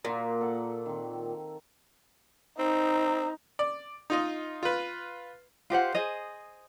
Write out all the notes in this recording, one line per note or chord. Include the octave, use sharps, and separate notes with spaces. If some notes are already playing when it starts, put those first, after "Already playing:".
A#2 A#3 F4 F#4
A4 F5 F#5
D#3 C4
C4 D#4
D5
D#4 F4 D#5
F4 B4
F4 G4 C5 F#5
G#4 C5 D#5